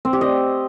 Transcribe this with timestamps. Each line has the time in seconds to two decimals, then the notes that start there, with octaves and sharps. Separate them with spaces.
0.05 C4
0.13 G4
0.21 D#5